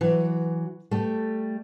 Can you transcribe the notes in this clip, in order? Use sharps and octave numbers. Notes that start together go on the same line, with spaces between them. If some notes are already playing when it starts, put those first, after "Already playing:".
E3 F#3
G3 A3